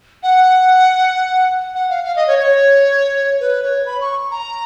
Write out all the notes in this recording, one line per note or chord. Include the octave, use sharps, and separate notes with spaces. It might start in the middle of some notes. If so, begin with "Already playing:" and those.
F#5
F#5
F5
F5
D#5
C#5
C#5
B4
C#5
B5
C#6
A#5